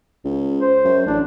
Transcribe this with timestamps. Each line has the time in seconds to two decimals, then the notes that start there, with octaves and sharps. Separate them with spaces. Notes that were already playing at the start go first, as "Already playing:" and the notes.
0.24 C#2
0.60 C5
0.85 F#2
1.06 A1 D4